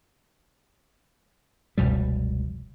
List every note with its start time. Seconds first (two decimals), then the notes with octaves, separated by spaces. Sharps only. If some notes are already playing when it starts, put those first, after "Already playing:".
1.78 F1 C#2 B2 G3